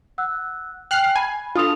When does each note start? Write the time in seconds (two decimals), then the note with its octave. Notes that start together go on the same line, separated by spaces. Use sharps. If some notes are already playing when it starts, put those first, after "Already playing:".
0.18 F#5 E6 F#6
0.91 G5 G#5 F6 F#6 C7
1.16 G#5 B5
1.55 D4 F4 A4 D#6 F7